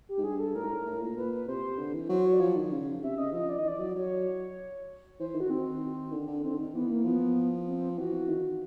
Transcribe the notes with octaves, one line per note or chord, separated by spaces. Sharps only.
G4
G#2
G2 G#4
A4
A2 A#4
G#2
A2
A2
A#2
A#2 B4
B4
C3 C5
D3
E3
F#3 C5
C#5
D5
F3 C#5
D#3
C#3
C3 E5
C#3 D#5
F3 D#5
D5
D#3 D#5
E3 D5
F#3
F#3 C#5
E3 C5
C5
D#3
F#4
D#3 C4
D3
D3
D#3 C4
D3
D#3
E3 B3
A#3
F3 B3
C4
E3 F#4
D#3